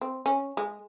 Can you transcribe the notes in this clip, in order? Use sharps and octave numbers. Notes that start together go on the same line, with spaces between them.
C4
C#4
G#3